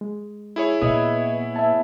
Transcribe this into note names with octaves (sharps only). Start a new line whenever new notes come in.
G#3
E4 G#4 C#5
A#2 B3 D#5 E5 D#6
E5 A5